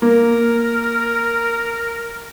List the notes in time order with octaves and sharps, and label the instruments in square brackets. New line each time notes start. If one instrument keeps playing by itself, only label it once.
[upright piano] A#3 [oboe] A#4